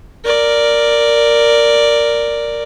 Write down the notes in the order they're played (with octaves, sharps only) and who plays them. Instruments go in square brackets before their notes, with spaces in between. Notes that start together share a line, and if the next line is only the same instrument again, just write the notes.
[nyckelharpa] A#4 D5